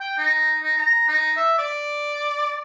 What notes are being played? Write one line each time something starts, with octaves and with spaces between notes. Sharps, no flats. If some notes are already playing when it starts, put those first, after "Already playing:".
G5
D#4
D#4
A#5
D#4
E5
D5